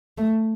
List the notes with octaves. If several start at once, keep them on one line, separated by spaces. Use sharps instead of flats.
A3